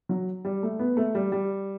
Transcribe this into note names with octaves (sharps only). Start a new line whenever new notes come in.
F#3
G3
A3
B3
A3
G3
G3